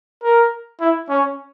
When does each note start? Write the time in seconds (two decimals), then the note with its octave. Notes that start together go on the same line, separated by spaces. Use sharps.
0.23 A#4
0.81 E4
1.10 C#4